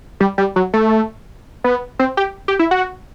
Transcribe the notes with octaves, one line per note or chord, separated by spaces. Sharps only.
G3
G3
F#3
A3
B3
C4
G4
G4
E4
F#4